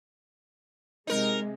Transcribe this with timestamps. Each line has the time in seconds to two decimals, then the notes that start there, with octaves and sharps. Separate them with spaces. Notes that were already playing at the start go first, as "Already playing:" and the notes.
1.07 C3 G#3 D#4 A#4